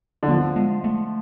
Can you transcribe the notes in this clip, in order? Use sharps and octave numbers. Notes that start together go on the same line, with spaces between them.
D3
F3 B3
G#3
A3